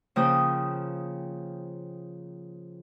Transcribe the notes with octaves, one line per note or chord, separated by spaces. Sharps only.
C#3 F3 A#3 G5 D#6 G6